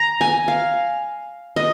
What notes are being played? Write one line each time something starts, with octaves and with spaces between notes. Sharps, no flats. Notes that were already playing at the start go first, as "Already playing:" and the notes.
Already playing: A#5
G#5
F5
D#5